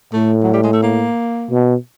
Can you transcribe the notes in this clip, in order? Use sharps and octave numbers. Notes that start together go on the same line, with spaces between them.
A2 A3
F#3
G3
G#3
A3
A#3
B2